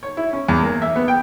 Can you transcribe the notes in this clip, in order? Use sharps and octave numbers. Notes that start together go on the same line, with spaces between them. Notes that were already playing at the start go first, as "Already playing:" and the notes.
C#5
E4
C#4
E2
A#3
E5
B3
G5